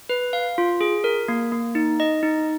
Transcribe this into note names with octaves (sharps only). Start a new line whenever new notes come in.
B4
F5
F4
G#4
A#4
A#3
A#3
D#4
D#5
D#4